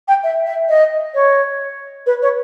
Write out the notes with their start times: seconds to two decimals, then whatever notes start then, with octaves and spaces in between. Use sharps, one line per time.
0.08 G5
0.24 E5
0.46 E5
0.69 D#5
1.15 C#5
2.06 B4
2.22 C#5